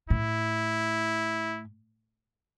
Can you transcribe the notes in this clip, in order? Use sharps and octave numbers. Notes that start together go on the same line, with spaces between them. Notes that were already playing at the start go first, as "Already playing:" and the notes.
A2 E4